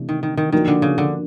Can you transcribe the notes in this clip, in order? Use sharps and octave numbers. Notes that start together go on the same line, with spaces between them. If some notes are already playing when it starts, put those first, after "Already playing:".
Already playing: C3 E3 A3 D4
D#3
D#3
D#3
D#3 F3 A#3 D4 F#4 A#4
D3
C#3
D3